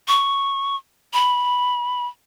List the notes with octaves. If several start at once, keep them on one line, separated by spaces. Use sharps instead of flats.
C#6
B5